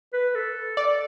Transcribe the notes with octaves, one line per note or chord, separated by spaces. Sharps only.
B4
A4
D5